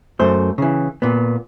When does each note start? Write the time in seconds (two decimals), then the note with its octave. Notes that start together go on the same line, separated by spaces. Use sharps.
0.20 F#2 A3 C5
0.58 C#3 E3
1.02 A#2 B3